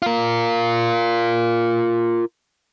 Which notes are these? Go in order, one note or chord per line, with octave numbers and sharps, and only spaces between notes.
F4 A#4